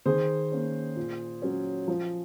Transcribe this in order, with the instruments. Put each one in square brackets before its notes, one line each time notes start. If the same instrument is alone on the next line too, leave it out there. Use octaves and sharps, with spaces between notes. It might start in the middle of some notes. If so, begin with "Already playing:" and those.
[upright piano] D#3 G#4 C5
A#3 C#4
A#2
F#3 C#4
F3